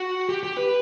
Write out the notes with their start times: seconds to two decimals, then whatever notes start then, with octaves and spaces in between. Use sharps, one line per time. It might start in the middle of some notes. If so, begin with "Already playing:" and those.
Already playing: F#4
0.29 G4
0.43 G4
0.57 B4